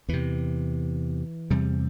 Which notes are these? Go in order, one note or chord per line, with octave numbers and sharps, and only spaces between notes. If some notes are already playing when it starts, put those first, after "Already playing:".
E2 C3 E3
E2 C3 G3